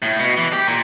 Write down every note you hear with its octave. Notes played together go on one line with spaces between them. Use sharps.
A2
B2
E3
G4
A#2